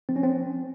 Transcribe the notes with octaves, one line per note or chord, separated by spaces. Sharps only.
F3 C4
C#4
C4